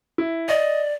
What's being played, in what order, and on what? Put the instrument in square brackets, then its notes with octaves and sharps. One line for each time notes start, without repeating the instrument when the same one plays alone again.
[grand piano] E4
[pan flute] D5 [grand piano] D#5